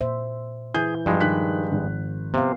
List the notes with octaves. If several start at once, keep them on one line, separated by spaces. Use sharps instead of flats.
A#2 C5 E5
E3 G#4 G6
G2 F3 G#3 F4 G#4
D#3 F#6 B6
G#1
C3 B3 F5